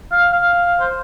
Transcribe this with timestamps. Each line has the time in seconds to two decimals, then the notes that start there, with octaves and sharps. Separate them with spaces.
0.12 F5
0.32 F5
0.80 C5